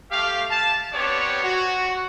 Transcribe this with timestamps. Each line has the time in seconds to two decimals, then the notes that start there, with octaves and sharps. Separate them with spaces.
0.11 A3 G4 F5
0.50 A5
0.93 B3 C4 D4 G4 C#5
1.43 F#4